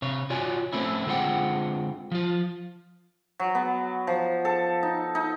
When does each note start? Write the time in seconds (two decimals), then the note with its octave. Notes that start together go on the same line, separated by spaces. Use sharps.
0.02 C3 C#5
0.30 F4 F#4 C#5 D5 G#5
0.73 A3 C4 C#4 E4
1.06 D3 G#3 C4 F4 F#5 G5
2.12 F3 F4
3.39 F#3
3.55 B3
4.07 F3
4.45 A4
4.83 D#4
5.15 D#4